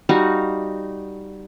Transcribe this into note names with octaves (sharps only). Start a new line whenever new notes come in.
G3 D#4 F#4 F5